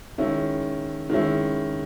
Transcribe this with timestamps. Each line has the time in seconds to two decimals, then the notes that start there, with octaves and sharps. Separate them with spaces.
0.18 D#3 G#3 C#4 E4
1.10 D#3 G#3 C#4 E4